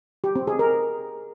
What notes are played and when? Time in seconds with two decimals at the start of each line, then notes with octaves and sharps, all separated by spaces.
0.24 G4
0.36 C4
0.47 G#4
0.59 A#4